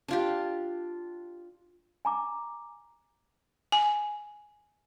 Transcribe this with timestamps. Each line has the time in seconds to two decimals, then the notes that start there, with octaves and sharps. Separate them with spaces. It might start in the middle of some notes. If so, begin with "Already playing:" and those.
0.08 D4 F4 G4
2.05 G#5 A#5 D6
3.72 G#5